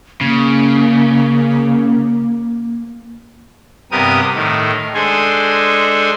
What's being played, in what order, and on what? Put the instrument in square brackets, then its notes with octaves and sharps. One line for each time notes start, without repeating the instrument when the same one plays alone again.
[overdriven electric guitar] C#3 [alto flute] A#3
[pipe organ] G2 C3 B3 G4 A#4 D#6
A2 D#3
G#3 D4 A4 C5 G#5